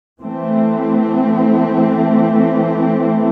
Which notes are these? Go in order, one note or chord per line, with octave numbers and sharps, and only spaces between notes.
E3 A3 C4